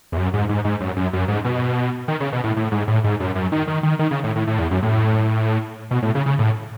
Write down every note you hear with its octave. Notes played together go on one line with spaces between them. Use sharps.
E2
F#2
G#2
G#2
G#2
F#2
F#2
F#2
G#2
B2
D#3
C#3
B2
A2
A2
G#2
A2
G#2
F#2
F#2
D#3
D#3
D#3
D#3
C#3
A2
A2
A2
E2
F#2
A2
B2
A2
C#3
C#3
A2